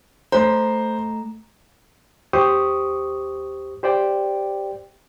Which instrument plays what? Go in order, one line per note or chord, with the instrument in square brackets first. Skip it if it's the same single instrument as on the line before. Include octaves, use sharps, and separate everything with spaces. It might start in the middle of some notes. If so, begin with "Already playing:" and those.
[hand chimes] A3 A#5 [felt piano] C5
[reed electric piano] D#2 G4 C5 C#6 D#6
G4 C5 D5 G5